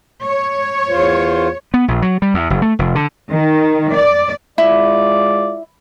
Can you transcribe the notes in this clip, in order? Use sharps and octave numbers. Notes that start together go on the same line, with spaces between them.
C#5
E2 F4 C5
B3
A#1
F#3
G3
E2
F#1
A3
F1
D3
D#3
D5
G#3 E4 F4 D5